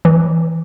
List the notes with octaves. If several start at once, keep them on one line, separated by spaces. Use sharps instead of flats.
E3